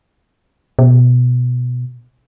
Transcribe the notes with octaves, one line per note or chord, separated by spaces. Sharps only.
B2